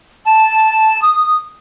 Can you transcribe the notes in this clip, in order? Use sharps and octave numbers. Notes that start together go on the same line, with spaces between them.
A5
D#6